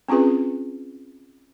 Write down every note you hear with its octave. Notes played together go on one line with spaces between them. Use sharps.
C4 C#4 F4 G#4 B4